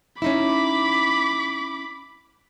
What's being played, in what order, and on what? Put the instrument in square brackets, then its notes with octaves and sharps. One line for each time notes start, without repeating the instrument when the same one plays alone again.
[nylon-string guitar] C#4 D#4 E4 [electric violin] B5 D6